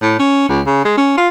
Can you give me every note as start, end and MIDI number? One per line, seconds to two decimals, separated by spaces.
0.02 0.15 45
0.19 0.45 61
0.49 0.61 37
0.66 0.84 49
0.85 0.96 56
0.97 1.15 61
1.17 1.28 65